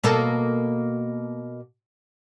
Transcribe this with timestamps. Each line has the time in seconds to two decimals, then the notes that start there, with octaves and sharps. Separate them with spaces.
0.04 B2 A#3 A4